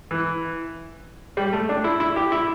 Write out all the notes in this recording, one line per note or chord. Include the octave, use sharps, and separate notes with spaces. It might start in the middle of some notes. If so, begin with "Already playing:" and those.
E3
G3
A3
D4
E4
E4
G4
E4